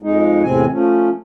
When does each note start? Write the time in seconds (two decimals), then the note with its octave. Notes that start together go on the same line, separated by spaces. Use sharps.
0.02 F2 G#3 D#4
0.43 E2 A2 C3 C4 G#5
0.72 F3 A3 C#4